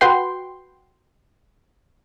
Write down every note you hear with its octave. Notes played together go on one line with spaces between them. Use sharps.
F#4 B4 G5 C6